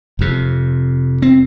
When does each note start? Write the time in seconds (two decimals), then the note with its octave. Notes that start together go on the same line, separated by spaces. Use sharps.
0.19 F1 F2 C3
1.22 C4